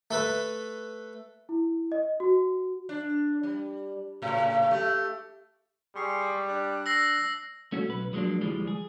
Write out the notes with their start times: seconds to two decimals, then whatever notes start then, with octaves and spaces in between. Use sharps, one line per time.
0.11 A3 A4 B4
1.49 E4
1.92 D#5
2.20 F#4
2.89 D4
3.43 G3
4.22 A2 C#3
4.71 A3 G4
5.96 G3 G#4 C6 C#6
6.49 D4 D5 F#6
6.86 E6 A#6 C7
7.72 A3 C#4 F#4
7.89 B1 B4
8.13 F3 F#3 G#3 A#3 D4
8.41 D2 E3 F3 G3 G#3
8.67 G#4